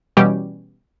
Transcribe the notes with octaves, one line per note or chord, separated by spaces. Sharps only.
B2 E3 G3 C#4 G4